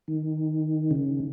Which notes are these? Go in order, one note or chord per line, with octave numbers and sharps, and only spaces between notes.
D#3
C#3